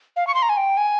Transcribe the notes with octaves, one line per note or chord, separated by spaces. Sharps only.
F5
C#6
C6
A#5
G#5
G5
G#5